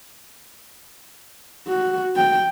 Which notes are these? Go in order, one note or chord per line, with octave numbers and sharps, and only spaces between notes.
F#4
G5